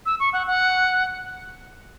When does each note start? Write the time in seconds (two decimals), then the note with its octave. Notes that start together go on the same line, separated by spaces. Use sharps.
0.06 E6
0.20 C#6
0.33 F#5
0.47 F#5